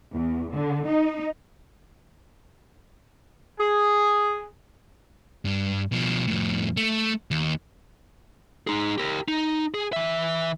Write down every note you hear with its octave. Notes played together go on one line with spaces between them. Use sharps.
E2
D3
D#4
G#4
G2
B2 F3
F2 A2
A3
D#2
D#4 G#4
G4 A#4
D#4
G#4
E3 E5